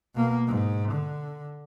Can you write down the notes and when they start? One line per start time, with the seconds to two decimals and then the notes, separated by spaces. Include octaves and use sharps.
0.15 B2 A#3
0.47 G#2
0.92 D3